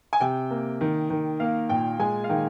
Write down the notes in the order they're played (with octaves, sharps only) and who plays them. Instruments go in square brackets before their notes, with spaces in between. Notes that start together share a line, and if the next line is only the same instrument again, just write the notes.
[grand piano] G#5
C3 G5
A#3
D#3
D#3
A#3 F5
A#2 G5
G#3 G#5
F5
D#3 G5